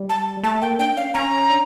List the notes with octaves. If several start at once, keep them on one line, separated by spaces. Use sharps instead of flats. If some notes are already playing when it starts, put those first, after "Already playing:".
Already playing: G3
A5
A3 A5
A#3 G5
D4 G5
C#4 F5
C#4 A#5
D4